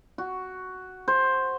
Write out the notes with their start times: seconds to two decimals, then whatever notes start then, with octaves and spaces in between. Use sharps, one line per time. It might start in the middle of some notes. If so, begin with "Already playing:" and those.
0.18 F#4
1.08 C5